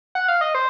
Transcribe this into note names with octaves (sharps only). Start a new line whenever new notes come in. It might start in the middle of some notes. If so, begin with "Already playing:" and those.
F#5
F5
D#5
C5